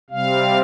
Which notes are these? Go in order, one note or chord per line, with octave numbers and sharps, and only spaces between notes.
C3 G3 C4 F5